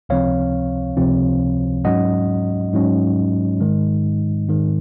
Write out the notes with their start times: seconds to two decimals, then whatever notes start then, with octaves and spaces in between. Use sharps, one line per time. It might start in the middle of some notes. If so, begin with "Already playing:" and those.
0.09 C#2 C3 F3 C4 C#5 F5
0.97 C#2 C3 F3 C4
1.85 G#2 F#3 C#4 D#5 F#5
2.73 G#2 F#3 C#4
3.60 G#2 D#3 G#3
4.49 G#2 D#3 G#3